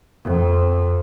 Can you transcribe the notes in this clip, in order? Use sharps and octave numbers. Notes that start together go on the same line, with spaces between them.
F2